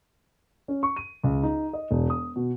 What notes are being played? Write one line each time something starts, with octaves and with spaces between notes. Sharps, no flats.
C#4
C#6
D#7
C#2
D#4
D#5
E1
D#6
B2